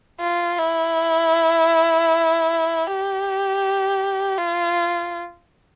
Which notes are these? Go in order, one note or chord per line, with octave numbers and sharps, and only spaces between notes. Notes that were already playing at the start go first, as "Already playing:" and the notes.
F4
E4
G4
F4